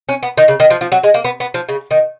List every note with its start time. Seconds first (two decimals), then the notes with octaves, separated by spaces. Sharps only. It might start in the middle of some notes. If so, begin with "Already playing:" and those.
0.09 C#4
0.23 B3
0.38 D#3
0.48 C#3
0.60 D#3
0.70 F3
0.81 F3
0.92 F#3
1.04 G#3
1.14 A#3
1.25 B3
1.40 B3
1.54 F3
1.69 C#3
1.91 D#3